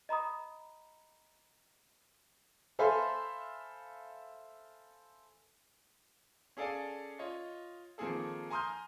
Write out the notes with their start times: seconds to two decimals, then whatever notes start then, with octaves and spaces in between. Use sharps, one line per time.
0.09 D#5 A#5 B5 D#6
2.79 A4 C5 E5 F5 G#5 B5
6.57 C#4 G#4 A4 D5 F5 G#5
7.19 F4 C#5 D#5
7.98 D#3 F3 A#3 C4 G#4 A4
8.50 G#5 A#5 C6 D#6 F6 G6